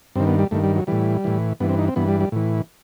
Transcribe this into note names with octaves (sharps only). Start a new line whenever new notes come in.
G2 D#3 C4
B3
G3
G2 D#3 A3
G3
F#3
A2 E3 G3
A2 E3
G2 E3 B3
C4
D#4
C4
G2 E3 B3
G3
G3
A2 E3